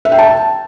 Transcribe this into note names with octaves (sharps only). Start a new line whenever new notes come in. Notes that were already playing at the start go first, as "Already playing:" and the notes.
E5
G5
A5